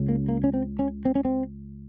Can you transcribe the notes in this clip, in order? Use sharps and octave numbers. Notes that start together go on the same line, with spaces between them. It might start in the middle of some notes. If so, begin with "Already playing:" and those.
Already playing: C#2 C#3
A#3
A#3
C#4
C4
C#4
C4
C#4
C4